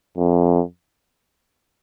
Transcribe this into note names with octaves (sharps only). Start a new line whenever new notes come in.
F2